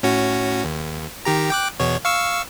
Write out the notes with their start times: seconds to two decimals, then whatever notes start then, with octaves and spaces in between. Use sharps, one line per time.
0.03 A2 C#4 F#4
0.65 D#2
1.25 D#3 G4 A#5
1.50 G5 D6 F#6
1.80 E2 B2 C#5
2.05 F5 C#6 E6